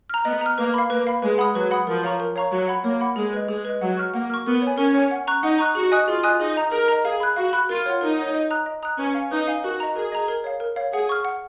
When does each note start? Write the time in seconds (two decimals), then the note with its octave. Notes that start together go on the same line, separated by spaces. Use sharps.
0.10 A#5 F6
0.25 B3 D#5
0.41 A#5 F6
0.58 A#3 B4
0.74 F5 B5
0.90 A#3 B4
1.07 F5 B5
1.22 G#3 B4
1.38 F#5 B5 D#6
1.54 F#3 B4
1.71 F#5 B5 D#6
1.87 F3 A#4
2.03 C#5 F5 A#5 C#6
2.20 A#4
2.36 C#5 F5 A#5 C#6
2.51 F#3 C#5
2.68 F#5 B5
2.84 A#3 C#5
3.01 F#5 B5
3.16 G#3 G#4
3.33 B4 D#5
3.48 G#3 G#4
3.65 B4 D#5
3.81 F#3 F#5
3.97 C#6 F6
4.14 A#3 F#5
4.30 C#6 F6
4.46 B3 A#4
4.62 C#5
4.67 G#5
4.78 C#4 A#4
4.95 C#5 G#5
5.11 F#5
5.27 A#5 C#6 F#6
5.43 D#4 F#5
5.59 A#5 C#6 F#6
5.75 F#4 G#4
5.92 D#5 G#5 D#6 F#6
6.08 F4 G#4
6.23 D#5 G#5 D#6 F#6
6.40 D#4 G#4
6.56 D#5 A#5
6.72 G#4 A#4
6.88 D#5 A#5
7.05 G#4 F5
7.20 B5 F#6
7.36 F#4 F5
7.53 B5 F#6
7.69 F4 A#4
7.86 C#5 F#5
8.01 D#4 A#4
8.18 C#5 F#5
8.34 D#5
8.51 A#5 D#6 F#6
8.66 D#5
8.83 A#5 D#6 F#6
8.98 C#4 B4
9.14 F5 G#5
9.31 D#4 B4
9.48 F5 G#5
9.64 F#4 A#4
9.80 D#5 A#5
9.96 G#4 A#4
10.12 D#5 A#5
10.28 A#4
10.44 C#5 F5
10.60 A#4
10.76 C#5 F5
10.93 G#4 F#5
11.09 C#6 F6
11.25 F#5